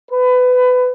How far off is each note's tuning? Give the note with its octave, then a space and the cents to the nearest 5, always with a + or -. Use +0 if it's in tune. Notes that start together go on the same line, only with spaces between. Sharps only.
B4 +25